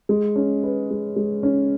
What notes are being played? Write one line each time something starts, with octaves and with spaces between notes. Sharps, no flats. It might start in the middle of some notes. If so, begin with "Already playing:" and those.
G#3
C#4
B4
G#3
G#3
C#4